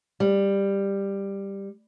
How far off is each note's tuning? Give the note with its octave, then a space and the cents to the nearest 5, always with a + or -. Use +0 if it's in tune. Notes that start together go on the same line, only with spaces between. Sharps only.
G3 +10